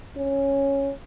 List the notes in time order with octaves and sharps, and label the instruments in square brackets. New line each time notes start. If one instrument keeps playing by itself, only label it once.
[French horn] C#4